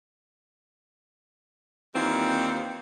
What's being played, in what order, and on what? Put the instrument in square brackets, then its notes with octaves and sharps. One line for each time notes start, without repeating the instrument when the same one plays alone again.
[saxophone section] D#2 D#3 E3 G3 C4 F4